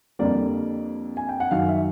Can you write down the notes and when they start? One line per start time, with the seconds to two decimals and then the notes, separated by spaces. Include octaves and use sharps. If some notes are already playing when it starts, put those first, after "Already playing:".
0.19 F2 D3 G3 A#3 D5
1.17 G#5
1.29 G5
1.40 F#5
1.51 F#2 D#3 F#3 F5
1.69 E5